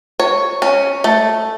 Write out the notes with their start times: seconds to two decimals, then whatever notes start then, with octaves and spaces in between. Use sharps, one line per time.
0.20 C#5
0.62 C#4
1.04 A3